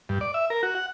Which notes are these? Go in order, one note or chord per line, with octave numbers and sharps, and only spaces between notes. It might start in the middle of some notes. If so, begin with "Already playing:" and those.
G2
D5
E5
A#4
F#4
F#5